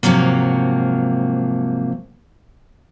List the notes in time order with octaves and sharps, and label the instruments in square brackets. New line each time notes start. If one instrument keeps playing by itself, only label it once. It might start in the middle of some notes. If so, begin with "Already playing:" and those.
[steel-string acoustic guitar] G#2 C3 F3 F#3 A#3